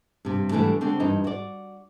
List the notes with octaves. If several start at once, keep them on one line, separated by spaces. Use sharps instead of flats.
G2 C3
D3 E3 G3 A3
D3 C4 C#5 D5
G2 E3 D#4
F#4 D5